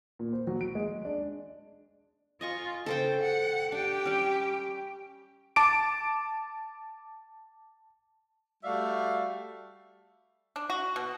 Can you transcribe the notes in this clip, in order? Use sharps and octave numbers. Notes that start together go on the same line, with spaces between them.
A#2
C5
F#3
D7
G#3
D4
F4 D#5 G#5 C#6
C#3 A4 C5 G5
F#5
D4 G4 G5
G3 C#4
A5 D6 D7
G3 A3 F#4 D5 E5 F5
D4
F#4
B2